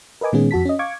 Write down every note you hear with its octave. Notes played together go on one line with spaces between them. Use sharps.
A#4 B4 D#5 G#5 D6
A#2 D#3 G#3 B3 C#4 G#4
F2 F#4 A5 B6
C#4 D#5
F5 C#6 D6 G#6